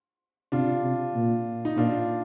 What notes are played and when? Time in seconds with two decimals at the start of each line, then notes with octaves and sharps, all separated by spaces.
0.52 C3 D4 F4
0.83 C3
1.15 A#2
1.65 D#4
1.77 A#2 D4 F4